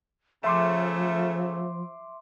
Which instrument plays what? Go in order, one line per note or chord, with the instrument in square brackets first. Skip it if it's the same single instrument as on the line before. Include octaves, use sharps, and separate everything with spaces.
[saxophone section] C#3 A3 [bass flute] F3 [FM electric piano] E5 C6 D6